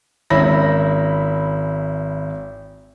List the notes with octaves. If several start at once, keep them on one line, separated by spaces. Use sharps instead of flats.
G#1 C#4 E4 B5 A#6